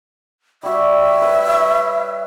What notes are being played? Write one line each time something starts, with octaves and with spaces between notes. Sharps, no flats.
G3 F#4 E5
B4 C#5